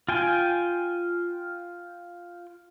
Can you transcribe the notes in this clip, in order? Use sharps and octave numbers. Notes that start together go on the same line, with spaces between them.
F4 G5 G#5